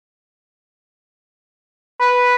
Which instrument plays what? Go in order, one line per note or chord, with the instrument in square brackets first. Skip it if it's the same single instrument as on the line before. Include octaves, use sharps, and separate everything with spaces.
[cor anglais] B4